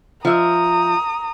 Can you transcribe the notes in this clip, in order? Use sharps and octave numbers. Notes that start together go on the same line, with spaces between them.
F3 E5 A#5 D#6